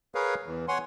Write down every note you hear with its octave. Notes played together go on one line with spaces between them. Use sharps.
G#4 A#4 B4 C#5 F5
E2 E3
C#5 F#5 G#5 C6